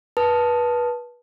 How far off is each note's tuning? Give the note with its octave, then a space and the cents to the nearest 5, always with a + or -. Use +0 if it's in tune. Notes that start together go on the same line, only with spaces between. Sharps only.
B4 -25 A5 +0 D#6 +0